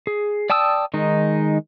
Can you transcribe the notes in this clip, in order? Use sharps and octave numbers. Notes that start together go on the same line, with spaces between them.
G#4
D5 G5 A5 D#6 E6
D#3 G#3 D#4